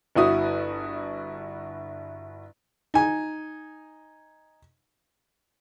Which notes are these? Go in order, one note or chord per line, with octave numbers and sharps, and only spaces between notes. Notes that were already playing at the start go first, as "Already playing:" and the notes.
G1 E4 F#4 D#6
D#4 G#5